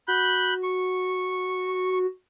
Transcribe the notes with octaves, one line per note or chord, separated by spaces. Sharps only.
F#4 B5 F#6 G6
C#6